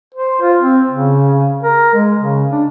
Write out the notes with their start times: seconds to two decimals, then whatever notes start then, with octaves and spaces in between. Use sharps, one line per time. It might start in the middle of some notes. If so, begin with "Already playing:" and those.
0.15 C5
0.42 F4
0.61 C4
0.90 C#3
1.63 A#4
1.94 G#3
2.19 C#3
2.52 D4